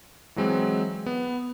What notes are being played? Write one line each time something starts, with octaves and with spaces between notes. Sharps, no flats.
E3 F#3 G#3 C4
B3